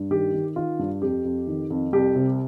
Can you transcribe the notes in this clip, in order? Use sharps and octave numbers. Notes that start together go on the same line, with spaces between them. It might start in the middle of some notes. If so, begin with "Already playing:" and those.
Already playing: G2
D#3 G4
D#3
D#3 F4
G2
F2 G4
F2
D#3
F2
C2 G4
C3